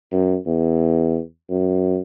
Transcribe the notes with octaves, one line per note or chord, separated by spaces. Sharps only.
F#2
E2
F#2